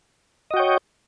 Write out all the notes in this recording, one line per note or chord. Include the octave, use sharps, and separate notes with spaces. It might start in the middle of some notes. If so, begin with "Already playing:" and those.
F#4 C#5 D#5 G5